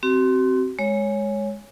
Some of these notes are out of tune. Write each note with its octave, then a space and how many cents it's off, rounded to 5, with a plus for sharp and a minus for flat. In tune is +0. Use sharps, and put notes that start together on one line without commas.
C4 +0 F#4 +40
G#3 +0 C#5 +0